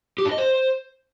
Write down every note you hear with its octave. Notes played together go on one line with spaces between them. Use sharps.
G4
D4
D#5
C5